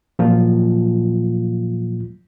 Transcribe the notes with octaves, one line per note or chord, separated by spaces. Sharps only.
A#2 F3 F#3 A#3 F4